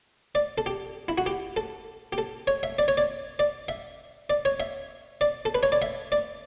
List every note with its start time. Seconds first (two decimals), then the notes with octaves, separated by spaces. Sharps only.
0.35 D5
0.58 A4
0.66 G4
1.08 E4
1.18 F#4
1.26 G4
1.57 A4
2.13 G4
2.18 A4
2.47 C#5
2.63 E5
2.79 D5
2.88 C#5
2.98 D5
3.39 D5
3.69 E5
4.30 D5
4.45 C#5
4.60 E5
5.21 D5
5.45 A4
5.55 B4
5.63 C#5
5.72 D5
5.82 E5
6.12 D5